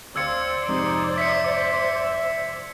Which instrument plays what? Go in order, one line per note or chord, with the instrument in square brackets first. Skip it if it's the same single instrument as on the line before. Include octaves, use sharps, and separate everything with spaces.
[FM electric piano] D2 F5 [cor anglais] C4 [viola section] C5 D5 [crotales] E6 G#6 C#7
[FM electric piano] F2 G#2 C3 [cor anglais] D#4
[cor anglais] E5 [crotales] B6 C#7